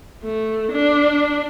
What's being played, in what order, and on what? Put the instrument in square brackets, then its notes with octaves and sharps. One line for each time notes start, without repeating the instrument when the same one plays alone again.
[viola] A3
D4